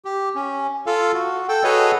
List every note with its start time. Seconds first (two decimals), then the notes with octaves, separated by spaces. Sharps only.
0.05 G4
0.35 C#4
0.86 F4 A4 F5
1.14 F#4
1.49 A4 G5
1.64 F#4 G#4 A4 B4 C#5 D#5